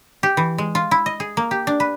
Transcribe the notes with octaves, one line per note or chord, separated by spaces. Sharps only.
G4
E3
G#3
F4
E4
D#5
G#4
A#3
G4
D4
B4